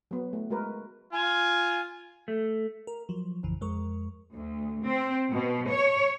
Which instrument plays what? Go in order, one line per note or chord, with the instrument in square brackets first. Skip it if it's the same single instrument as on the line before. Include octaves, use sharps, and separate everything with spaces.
[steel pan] F#3 B3
A3
G#3 F#4 A#4 B4
[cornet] F4 [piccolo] G#5
[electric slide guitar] A3
[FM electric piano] A#4
F3 F#3
A1 F2 C#3 E3
F2 G#3 A#4 C#6
[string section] D2
C4
B2
C#5